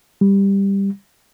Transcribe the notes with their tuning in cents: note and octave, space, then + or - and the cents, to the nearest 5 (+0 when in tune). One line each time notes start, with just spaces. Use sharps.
G3 +10